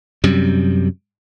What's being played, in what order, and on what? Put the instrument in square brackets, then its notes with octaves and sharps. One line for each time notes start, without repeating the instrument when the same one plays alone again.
[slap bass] F#2 C3 G3